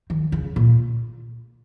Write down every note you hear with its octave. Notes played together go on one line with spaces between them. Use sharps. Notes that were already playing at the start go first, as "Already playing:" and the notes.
D#3
C#3
A#2